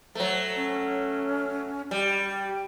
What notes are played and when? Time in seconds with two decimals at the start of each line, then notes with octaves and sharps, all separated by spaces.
0.15 F#3 A3 C5
0.55 C#4
1.91 G3 G4